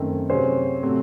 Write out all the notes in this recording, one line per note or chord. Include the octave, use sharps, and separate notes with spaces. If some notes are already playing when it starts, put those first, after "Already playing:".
Already playing: F#2 D#3 A3 C4
C3 F#3 C#4 G#4 C5
C3 F#3 A3 C4